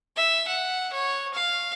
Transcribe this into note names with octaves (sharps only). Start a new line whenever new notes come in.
E5
F#5
C#5
F5